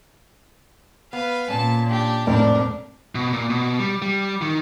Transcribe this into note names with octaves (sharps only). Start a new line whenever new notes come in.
B3 B4 F5
A#2 C#4 A5
D4 G4
F1 A2 C4 D4 A#4 D5
B2
A#2
B2
G3
G3
D#3